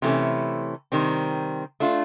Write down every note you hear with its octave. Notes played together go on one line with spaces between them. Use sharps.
C3 E3 A3 C#4
C3 D#3 G3 C4
A3 D4 F4